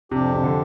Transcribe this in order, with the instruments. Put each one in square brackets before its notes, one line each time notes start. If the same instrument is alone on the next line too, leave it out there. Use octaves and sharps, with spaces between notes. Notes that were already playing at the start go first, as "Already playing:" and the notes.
[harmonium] F2 F3 D4 G4 [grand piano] C3
[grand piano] C3
D3